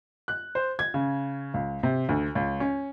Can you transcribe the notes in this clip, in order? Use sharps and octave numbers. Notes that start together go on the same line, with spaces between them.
F#6
C5
G#6
C#3
C#2
C3
D2
C#2
C#4